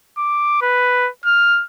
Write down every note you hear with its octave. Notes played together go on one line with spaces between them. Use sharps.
D6
B4
F6